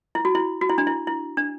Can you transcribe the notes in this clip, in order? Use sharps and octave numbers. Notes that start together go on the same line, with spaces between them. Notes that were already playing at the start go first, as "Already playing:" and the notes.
E4
F#4
E4
F#4
E4
D4
E4
E4
D4